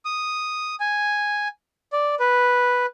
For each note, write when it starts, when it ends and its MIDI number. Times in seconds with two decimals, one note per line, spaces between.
0.05 0.75 87
0.80 1.48 80
1.93 2.15 74
2.20 2.86 71